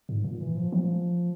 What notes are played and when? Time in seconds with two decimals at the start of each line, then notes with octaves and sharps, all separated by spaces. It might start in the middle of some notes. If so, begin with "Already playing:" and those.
0.09 G#2
0.24 A#2
0.41 E3
0.57 F3
0.72 F3